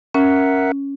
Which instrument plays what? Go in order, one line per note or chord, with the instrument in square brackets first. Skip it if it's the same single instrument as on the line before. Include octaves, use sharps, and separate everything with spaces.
[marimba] C#4 [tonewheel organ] A#4 E5 F#5